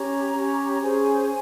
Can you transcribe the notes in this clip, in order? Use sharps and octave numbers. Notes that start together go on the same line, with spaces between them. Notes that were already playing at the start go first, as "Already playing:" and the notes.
Already playing: C#4 G4 C#5 A#5
C#4 G4 C#5
A#5
C#4 G#4 C5 G#5